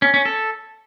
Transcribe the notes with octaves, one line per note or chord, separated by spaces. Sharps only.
C#4
C#4
A4